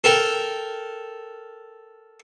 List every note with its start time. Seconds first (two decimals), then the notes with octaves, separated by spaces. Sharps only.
0.04 A4 A#4 G5